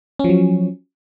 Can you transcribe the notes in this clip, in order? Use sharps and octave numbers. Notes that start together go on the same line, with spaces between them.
F3 F#3 C#4